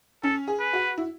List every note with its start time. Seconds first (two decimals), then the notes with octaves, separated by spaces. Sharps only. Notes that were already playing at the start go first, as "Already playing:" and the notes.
0.23 C#4 A4
0.48 G#4
0.60 B4
0.73 F#4
0.98 E4